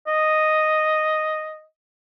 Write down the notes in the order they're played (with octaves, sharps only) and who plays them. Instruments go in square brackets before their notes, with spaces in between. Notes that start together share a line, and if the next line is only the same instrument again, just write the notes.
[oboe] D#5